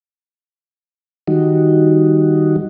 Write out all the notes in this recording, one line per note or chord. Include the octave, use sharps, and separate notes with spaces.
D#3 G3 D#4 F#4